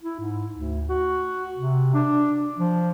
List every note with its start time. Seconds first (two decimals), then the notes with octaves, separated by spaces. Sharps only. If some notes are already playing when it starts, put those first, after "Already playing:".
0.02 E4
0.20 G#2
0.53 D2
0.89 F#4
1.57 C3
1.94 D4
2.58 F3